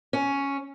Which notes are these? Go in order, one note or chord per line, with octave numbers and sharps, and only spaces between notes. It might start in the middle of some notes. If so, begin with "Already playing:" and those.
C#4